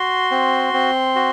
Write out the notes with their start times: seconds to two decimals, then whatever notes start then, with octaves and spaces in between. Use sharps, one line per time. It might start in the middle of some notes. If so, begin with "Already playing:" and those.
Already playing: F#4 C6
0.31 C4
0.73 C4
1.15 F#4